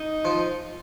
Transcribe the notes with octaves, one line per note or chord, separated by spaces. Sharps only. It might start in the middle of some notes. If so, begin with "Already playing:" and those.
Already playing: D#4
F3 F4